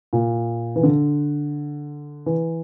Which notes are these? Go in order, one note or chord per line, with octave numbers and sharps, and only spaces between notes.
A#2
E3
D3
E3